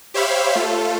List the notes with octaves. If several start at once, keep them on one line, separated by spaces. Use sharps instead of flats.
G4 C5 C#5 E5 F5 B5
A3 F4 A4